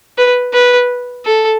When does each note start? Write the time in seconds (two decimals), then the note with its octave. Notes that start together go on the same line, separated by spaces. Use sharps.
0.18 B4
0.53 B4
1.25 A4